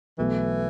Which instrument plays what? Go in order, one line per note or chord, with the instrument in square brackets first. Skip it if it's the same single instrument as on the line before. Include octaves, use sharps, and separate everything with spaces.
[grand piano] B1 B2 A3 [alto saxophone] E3